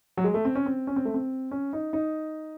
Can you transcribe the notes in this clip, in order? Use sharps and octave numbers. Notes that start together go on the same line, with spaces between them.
F#3
G#3
A3
C4
C#4
C4
C#4
C4
A3
C4
C#4
D#4
D#4